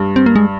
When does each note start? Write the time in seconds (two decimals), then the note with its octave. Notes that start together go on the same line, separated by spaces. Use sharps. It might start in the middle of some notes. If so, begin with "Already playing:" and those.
Already playing: G2
0.16 C4
0.26 A#3
0.36 G#3